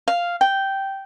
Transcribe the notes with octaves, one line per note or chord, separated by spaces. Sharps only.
F5
G5